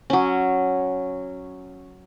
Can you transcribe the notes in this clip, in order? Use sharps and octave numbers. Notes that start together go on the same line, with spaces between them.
F#3 C#4